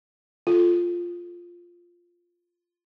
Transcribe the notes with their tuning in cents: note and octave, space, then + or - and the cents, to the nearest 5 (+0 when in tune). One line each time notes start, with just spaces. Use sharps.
F4 +0 A4 -5